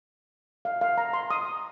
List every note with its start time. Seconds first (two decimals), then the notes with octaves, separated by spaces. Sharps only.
0.65 F5
0.81 F5
0.98 A#5
1.13 C6
1.30 D#6